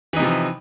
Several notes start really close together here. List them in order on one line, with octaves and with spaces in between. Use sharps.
E3 D#4 C3 F3